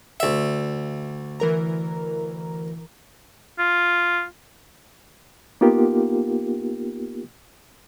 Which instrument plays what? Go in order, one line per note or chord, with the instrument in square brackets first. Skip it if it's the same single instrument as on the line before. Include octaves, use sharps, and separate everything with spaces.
[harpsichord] D2 E5
[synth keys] E3 A#4 A#5
[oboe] F4
[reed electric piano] A#3 B3 D#4 F4 G4 A#4